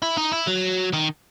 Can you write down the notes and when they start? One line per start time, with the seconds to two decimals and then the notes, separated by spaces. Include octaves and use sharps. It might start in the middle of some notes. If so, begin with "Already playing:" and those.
0.02 E4
0.17 D#4
0.32 E4
0.47 F#3
0.93 D#3